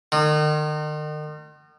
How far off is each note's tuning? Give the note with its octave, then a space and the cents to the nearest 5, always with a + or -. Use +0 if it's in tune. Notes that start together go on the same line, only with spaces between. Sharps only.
D#3 -40